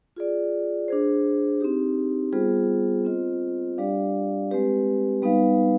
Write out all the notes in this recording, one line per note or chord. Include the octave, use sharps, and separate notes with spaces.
F4 G#4 D5
D4 G#4 C5
C4 D#4 G4
G3 B3 F4 G#4 C5
C4 F4 C5 D#5
G3 D4 G4 D5 F5
G#3 C4 G4 B4
G3 B3 D#4 B4 F5